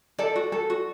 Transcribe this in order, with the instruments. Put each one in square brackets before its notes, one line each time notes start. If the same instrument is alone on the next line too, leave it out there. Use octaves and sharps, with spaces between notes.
[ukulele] A4 D5
F#4
A4
F#4